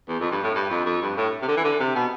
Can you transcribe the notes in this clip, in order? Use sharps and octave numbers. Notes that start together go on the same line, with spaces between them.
E2
F2
G2
A2
G2
F2
F2
G2
A2
C3
D3
E3
D3
C3
B2